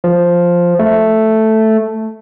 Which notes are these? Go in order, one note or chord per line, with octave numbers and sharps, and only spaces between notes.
F3
A3